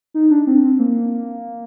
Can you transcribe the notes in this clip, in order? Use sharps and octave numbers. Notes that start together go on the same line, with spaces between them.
D#4
D4
C4
C4
A#3